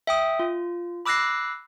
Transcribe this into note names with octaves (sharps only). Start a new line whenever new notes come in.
E5 G5 D#6
F4
B5 D6 E6 F#6 A#6 C7